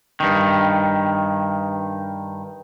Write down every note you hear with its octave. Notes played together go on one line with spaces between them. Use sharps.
G2 D#3